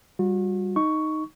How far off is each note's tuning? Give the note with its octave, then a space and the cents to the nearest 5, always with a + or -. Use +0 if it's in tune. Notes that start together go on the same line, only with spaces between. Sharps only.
G3 +0 F#4 -40
D#4 +0 C#6 +10